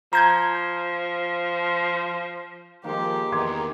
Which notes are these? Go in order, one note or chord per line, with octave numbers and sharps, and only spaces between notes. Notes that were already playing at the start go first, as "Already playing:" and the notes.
F3 A#5 G6 G#6
D#3 F3 G#3 A#3 G4
E2 D#3 C6 D6 G#6